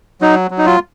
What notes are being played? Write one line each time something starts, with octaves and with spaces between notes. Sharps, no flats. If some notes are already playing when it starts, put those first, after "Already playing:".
F#3 D#4
F#3
D#4
F4